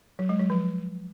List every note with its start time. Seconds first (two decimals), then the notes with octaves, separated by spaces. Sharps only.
0.19 F#3
0.29 G#3
0.40 F#3
0.50 F3